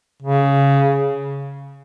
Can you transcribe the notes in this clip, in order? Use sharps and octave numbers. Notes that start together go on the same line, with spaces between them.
C#3